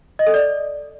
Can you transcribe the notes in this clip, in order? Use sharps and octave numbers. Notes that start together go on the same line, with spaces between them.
D#5
A4
D5